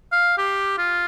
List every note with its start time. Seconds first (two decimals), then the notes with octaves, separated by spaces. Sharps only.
0.12 F5
0.38 G4
0.78 F4